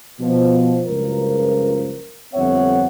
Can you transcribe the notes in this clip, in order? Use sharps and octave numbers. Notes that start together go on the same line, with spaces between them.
B2 F3
F#1 C#2 G2 F3 A#4
G1 F2 C4 C#5 E5 F#5